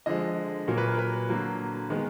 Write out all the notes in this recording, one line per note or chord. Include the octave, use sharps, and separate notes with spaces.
D3 F3 G#3 D#5
A#2 F#3 A#3 A#4
B4
A#4
B4
D3 F#3 A#3
D#3 G#3 B3